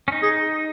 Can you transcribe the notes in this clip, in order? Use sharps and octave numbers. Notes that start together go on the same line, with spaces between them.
C#4
D#4
G#4